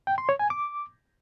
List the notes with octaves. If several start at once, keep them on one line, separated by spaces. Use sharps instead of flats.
G5
C6
C#5
G#5
D6